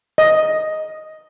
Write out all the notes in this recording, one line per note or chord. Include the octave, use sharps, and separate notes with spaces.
D#5